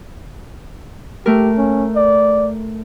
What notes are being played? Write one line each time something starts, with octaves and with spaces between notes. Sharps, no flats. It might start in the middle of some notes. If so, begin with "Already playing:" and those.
A3 G4 A#4
C#4
D5